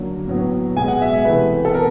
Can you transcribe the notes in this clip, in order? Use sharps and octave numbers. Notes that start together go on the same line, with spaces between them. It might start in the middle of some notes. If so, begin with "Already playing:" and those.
Already playing: D3 F#3 A#3
A2 F#3 B3
B2 G#3 B3 G#5
F#5
E5
E5
C3 E3 A3 B4
A4
B3 A#4